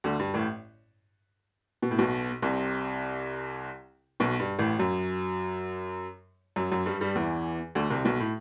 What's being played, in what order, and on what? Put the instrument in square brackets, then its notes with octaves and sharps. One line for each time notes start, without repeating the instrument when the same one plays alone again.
[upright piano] D2 D3
G2
A1 A2
B2
A2
B1 B2
C2 C3
B1 B2
G2
A1 A2
F#2 F#3
F#2 F#3
F#2 F#3
G2 G3
G2 G3
E2 E3
D2 D3
C2 C3
B1 B2
A2